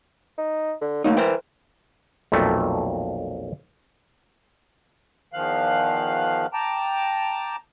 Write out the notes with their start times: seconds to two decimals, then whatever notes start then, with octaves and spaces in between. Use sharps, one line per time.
0.38 D#4
0.81 D3
1.04 F#3 A3 A#3 D#4
1.17 E3 A#4 C5 G5
2.32 B1 F2 A#2 A3
5.33 E2 D#3 F3 F5 F#6
6.53 G5 A5 A#5 D6